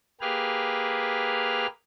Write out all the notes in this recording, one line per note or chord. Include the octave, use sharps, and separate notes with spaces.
A#3 G4 G#4 B4 F6